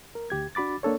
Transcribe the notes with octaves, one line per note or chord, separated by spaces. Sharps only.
A#4
D2 G4 G#6
D4 F#4 B5 D6 A6
A#3 D4 A4 C#5